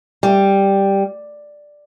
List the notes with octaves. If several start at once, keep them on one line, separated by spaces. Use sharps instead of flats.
G3